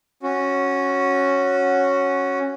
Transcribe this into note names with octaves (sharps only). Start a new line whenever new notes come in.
C#4 F#4